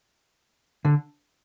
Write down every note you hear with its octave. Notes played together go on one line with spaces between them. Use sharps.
D3